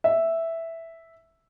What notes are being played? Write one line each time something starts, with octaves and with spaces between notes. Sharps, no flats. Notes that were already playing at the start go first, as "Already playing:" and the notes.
E5